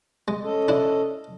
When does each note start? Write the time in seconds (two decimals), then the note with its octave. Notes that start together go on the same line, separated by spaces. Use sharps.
0.28 G#3
0.44 C#4 A4 D#5
0.68 D4 E4